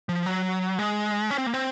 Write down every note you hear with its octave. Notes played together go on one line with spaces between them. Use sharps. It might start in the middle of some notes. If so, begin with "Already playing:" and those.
F3
F#3
G#3
C#4
C4
A#3
C4